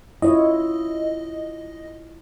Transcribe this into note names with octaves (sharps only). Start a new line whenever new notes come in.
E4 F4 C#5 D#5